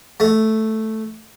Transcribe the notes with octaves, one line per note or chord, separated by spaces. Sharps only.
A3